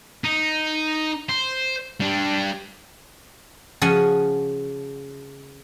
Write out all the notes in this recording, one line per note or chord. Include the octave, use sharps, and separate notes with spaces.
D#4
C5
G3 D4
C#3 F3 F#4 F#5 G#5